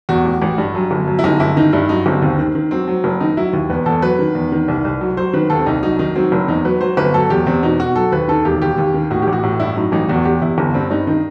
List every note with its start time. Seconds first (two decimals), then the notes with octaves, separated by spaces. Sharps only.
0.09 E2 F#4
0.25 A1
0.42 A1
0.58 G2
0.75 F#2
0.91 G1
1.07 F#2
1.19 E4
1.24 G1 D#4
1.40 G1 E4
1.57 D#3 D#4
1.73 G2 E4
1.89 F#3 D#4
2.06 G1 C4
2.22 D#2 C4
2.39 D#3
2.55 D#3
2.71 F#3 C4
2.88 F#3
3.04 F#1
3.20 D#3 D#4
3.37 F#3 E4
3.53 D#2
3.70 E2 B4
3.86 E2 A4
4.02 F#3 B4
4.19 D#3
4.35 E2
4.52 D#3
4.68 C2
4.85 C2
5.01 F#3
5.17 F#3 C5
5.33 D#3 B4
5.50 D#2 A4
5.59 C4
5.66 C2 D#4
5.83 F#3 D#4
5.99 D#3 D#4
6.15 F#3 C4
6.32 F#1 C4
6.48 E2 D#4
6.65 F#3 B4
6.81 F#3 C5
6.97 G1 B4
7.14 F#3 A4
7.30 E2 G4
7.47 E2 C4
7.63 B2 D#4
7.79 B2 F#4
7.96 F#3 A4
8.12 D#2 B4
8.28 D#3 A4
8.45 E1 G4
8.62 D#2 G4
8.78 D#2
8.94 D#3
9.11 A2 F#4
9.22 G4
9.27 A1
9.33 F#4
9.43 A2
9.60 G2 E4
9.76 F#3 D#4
9.92 A1 D#4
10.09 E2 F#4
10.25 E2 G4
10.42 E2 E4
10.58 G1
10.74 G2 C4
10.90 G2 D#4
11.07 D#3 D#4